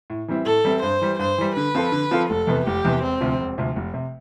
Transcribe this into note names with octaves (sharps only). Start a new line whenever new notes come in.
A2
E3 G3 C4 E4
A2 A4
E3 G3 C4 E4
G2 C5
E3 G3
G2 C5
E3 G3
D3 B4
F3 C4 F4 A4
D3
F3 C4 F4 A4
F1 A4
E2 C3 E3 B3
F1 G4
E2 C3 E3 B3
E1 C4
D2 C3 F3
E1
D2 C3 F3
F1
C3